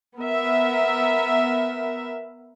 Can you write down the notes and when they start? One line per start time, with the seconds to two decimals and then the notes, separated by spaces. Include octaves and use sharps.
0.18 B3 A#4 E5